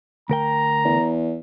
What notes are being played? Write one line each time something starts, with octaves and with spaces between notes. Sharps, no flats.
D2 A#4 G5 A#5
E2